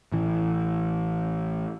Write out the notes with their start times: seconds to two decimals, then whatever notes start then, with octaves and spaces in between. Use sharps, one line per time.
0.12 A1 E3